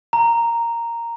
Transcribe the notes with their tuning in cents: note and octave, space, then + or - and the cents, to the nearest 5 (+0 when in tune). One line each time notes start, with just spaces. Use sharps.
A#5 -5